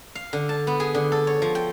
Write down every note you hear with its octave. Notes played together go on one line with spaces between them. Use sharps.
F5
D3
A5
B3
G#4
D3
A4
C#5
F3
G5